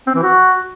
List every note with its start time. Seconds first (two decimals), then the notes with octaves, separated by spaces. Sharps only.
0.07 C4
0.15 E3
0.23 F#4